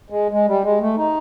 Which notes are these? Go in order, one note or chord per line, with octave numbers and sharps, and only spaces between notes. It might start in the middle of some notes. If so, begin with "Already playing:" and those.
G#3
G#3
G3
G#3
A3
D#4